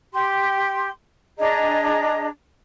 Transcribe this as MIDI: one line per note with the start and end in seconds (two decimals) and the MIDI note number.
0.12 0.89 67
0.12 0.89 84
1.37 2.26 62
1.37 2.26 68
1.37 2.26 75
1.37 2.26 82